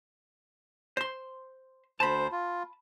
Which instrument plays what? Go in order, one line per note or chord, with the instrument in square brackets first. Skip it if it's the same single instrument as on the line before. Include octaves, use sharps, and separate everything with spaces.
[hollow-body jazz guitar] C5 C6
[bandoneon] D2 C5 [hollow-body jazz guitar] A5 B5
[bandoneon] F4